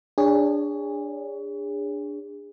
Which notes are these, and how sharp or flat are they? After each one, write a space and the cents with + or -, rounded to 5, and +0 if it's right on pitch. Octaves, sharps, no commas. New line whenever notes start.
D4 +0 G#4 -30 C#5 +20